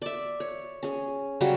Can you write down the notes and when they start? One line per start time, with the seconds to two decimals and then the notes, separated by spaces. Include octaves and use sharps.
0.02 D5 E5
0.40 C#5
0.83 C#4 G#4
1.41 C#3 F#3 G3 F#4